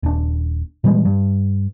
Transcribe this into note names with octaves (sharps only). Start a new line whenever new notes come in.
D#1 D4
A#2 E3 G3 G#3
G2